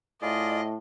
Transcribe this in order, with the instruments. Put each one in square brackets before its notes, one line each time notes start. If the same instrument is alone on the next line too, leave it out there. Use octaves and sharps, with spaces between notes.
[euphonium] A2 [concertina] F4 G#4 D5 [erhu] D#5